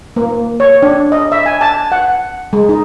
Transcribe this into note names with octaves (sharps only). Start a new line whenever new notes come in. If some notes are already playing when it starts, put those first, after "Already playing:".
A#3
C#5
D4
D#5
E5
G#5
A5
F#5
G#3
D#4